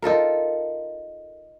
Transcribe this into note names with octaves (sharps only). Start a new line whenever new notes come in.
D#4 F4 A4 A#4